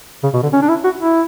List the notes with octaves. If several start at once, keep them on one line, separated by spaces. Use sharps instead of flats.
C#3
B2
D3
C#4
D4
E4
F#4
E4